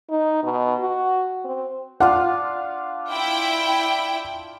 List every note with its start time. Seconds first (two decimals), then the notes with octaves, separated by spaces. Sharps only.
0.10 D#4
0.44 B2
0.80 F#4
1.45 C4
2.00 D4 F4 F5 F#5
3.11 E4 G5